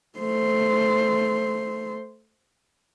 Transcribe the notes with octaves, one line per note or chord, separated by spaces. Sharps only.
A3 C5